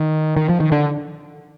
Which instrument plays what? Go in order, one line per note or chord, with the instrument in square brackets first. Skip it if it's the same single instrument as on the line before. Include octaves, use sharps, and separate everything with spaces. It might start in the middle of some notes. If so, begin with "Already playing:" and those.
Already playing: [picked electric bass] D#3
D#3
F3
D#3
D3